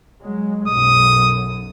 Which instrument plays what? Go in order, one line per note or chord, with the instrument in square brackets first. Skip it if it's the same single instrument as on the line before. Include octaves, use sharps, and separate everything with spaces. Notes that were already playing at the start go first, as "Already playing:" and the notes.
[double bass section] F#3 G#3
[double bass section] B1 F#2 [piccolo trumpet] D#6